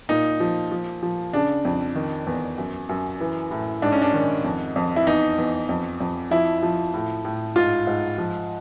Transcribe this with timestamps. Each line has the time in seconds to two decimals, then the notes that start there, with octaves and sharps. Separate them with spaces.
0.09 A#2 D#4
0.40 F3
0.72 F3
1.02 F3
1.33 C#3 D4
1.65 F2
1.96 D#3
2.27 E2
2.58 F#2
2.89 F#2
3.20 E3
3.51 A2
3.82 G#2 D4
3.92 C#4
4.02 D4
4.14 D#3
4.44 F2
4.76 F2
4.96 E4
5.07 E2 D#4
5.38 E2
5.69 F2
6.00 F2
6.31 F3 E4
6.63 F3
6.94 A2
7.25 A2
7.56 G#2 F4
7.87 G#2
8.18 F3